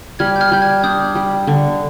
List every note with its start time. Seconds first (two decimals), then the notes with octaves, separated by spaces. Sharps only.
0.19 G3 F6 G#6
0.36 G6
0.40 F6 G#6
0.52 G3 G6
0.62 F6 G#6
0.83 D4 D#6 G6
1.15 G3
1.47 D3